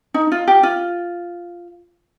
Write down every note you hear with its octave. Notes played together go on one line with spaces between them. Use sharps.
D#4
F4
G4
F4